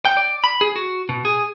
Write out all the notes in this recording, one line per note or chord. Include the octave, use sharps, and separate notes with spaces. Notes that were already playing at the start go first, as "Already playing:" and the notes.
G5
D5
B5
G#4
F#4
B2
G#4